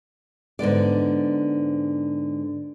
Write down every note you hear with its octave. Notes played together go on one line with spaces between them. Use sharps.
G#2 D3 B3 D5